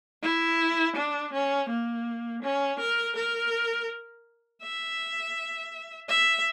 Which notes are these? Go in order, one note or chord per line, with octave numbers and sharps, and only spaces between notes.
E4
D4
C#4
A#3
C#4
A#4
A#4
E5
E5